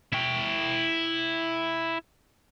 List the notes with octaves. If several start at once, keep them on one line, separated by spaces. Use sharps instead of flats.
E4 G5